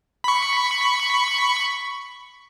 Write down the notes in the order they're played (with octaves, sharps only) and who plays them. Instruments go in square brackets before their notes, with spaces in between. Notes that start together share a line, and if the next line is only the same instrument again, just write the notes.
[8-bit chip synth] B5 C#6